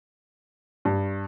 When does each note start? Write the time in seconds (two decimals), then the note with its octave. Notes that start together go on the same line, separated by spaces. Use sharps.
0.85 G2